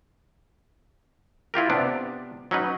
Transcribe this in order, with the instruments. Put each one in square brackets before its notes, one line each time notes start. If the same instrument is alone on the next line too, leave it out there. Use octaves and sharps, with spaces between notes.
[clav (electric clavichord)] E4 F4 G4 A#4
C3 B3 D4
F#3 C#4 D#4 B4